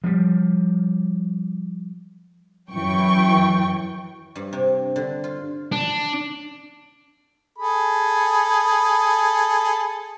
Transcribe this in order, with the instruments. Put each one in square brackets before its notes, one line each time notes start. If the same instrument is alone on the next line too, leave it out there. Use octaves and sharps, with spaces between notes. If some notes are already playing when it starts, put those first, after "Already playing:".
[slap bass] F3 G3
[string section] F#2 E3 G5 C#6
[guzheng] G2
C3
D3
F4
[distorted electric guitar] D4
[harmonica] G#4 A4 B5